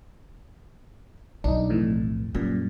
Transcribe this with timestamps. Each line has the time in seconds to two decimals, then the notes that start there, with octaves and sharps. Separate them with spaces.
1.44 B1 D4 D#4
1.70 F2 A2 E3
2.35 F#2 A#2 G3